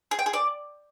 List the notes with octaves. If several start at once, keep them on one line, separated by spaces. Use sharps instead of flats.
G#4
G5
G#4
D5